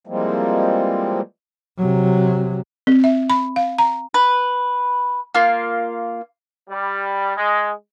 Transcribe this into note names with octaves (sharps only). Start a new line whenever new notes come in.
E3 F3 G3 G#3 A#3 C4
C3 F#3
C4
E5
B5
F5
A#5
B4
A#3 F4
G3
G#3